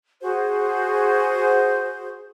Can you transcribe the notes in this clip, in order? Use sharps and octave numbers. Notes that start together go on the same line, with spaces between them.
F#4 G#4 C5